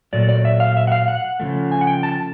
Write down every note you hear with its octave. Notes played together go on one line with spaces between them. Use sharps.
A#2 F#3 A3 D5
D5
E5
F5
E5
F#5
F5
F#5
C#3 F3 A3
G#5
F#5
G5
A5